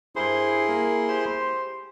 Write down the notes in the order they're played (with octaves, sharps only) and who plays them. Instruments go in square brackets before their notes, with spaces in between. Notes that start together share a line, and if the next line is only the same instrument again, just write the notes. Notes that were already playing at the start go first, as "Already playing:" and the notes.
[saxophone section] G2 A#4 C5 [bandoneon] E4 G#4 C6
[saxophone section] A#3
G4 C5